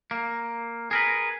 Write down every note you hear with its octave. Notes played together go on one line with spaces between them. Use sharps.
A#3
G#4 A#4 B4